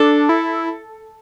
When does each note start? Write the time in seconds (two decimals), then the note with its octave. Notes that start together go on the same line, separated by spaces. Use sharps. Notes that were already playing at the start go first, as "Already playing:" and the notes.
Already playing: D4 A4
0.29 E4